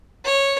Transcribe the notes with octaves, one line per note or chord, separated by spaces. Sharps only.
C#5